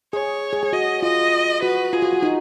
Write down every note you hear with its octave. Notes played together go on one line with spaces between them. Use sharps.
G#4 C#5
G#4
G#4
F#4 D#5
F4 D#5
F#4 B4
F4 G#4
F#4
F#4
D#4